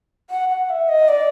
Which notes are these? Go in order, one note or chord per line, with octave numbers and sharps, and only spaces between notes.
F#5
F#5
E5
D#5
D5